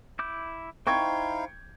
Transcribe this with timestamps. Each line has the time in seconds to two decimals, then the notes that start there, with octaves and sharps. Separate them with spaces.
0.19 E4 D6 G6
0.87 D#4 E4 C5 F5 G5 C6 C#6 G#6